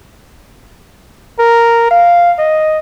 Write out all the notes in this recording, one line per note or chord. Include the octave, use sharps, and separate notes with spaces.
A#4
F5
D#5